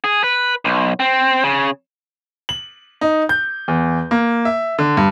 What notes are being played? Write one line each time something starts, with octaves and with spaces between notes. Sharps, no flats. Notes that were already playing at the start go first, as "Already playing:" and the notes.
G#4
B4
B1
C4
C#3
F#7
D#4
G6
E2
A#3
E5
D3
G2